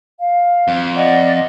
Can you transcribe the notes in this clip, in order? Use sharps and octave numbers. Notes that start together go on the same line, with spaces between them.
F5
F2
D5 D#5 F#5